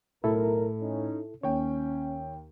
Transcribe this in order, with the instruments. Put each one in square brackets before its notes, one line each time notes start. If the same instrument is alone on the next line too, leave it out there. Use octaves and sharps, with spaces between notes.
[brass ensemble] B1 A#4 [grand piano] A2 [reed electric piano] E4 A4
[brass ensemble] C#4 D#4
[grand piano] D#2 G5 [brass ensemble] C#4 [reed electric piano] C#5